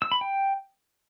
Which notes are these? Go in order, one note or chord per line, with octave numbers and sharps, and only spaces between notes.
E6
B5
G5